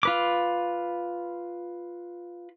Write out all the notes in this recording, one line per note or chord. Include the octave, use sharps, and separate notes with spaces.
F4 B4 D6